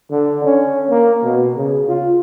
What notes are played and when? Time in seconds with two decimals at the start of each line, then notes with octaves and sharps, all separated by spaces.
0.11 D3
0.44 C#4
0.90 A#3
1.23 B2
1.56 C#3
1.88 F4